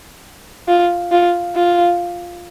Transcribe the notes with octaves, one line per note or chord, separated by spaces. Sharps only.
F4
F4
F4